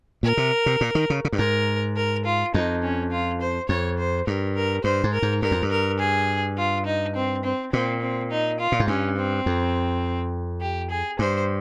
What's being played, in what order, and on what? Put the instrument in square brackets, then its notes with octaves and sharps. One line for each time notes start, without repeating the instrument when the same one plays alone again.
[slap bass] A#2 [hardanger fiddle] A#4
[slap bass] C3
C3
A#2
D#3
C#3
C#3
G2
[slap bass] G#2 [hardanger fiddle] A#4
[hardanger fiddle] A#4
F4
[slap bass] F2 [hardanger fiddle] D#4
[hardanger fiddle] C#4
F4
C5
[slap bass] F2 [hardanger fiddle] C#5
[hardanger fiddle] C5
[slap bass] G2 [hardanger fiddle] A#4
[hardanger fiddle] A#4
[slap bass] G2 [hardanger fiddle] C5
[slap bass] G#2
[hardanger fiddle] A#4
[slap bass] G#2
[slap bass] G2 [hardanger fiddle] A#4
[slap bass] F2
G2
[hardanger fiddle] A#4
G#4
F4
D#4
C4
C4
[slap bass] A#2 [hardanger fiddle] C4
[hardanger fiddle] C4
D#4
F4
[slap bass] A#2
G#2
[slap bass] G2 [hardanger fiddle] C#4
[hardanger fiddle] C4
[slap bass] F2
[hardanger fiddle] G4
G#4
[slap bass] G2 [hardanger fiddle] C5